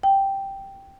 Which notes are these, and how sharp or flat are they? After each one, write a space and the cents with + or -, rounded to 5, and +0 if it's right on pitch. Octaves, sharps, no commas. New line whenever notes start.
G5 +0